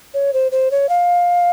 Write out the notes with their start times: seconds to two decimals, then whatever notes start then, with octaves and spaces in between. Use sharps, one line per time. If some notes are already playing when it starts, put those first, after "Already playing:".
0.14 C#5
0.33 C5
0.52 C5
0.71 C#5
0.89 F5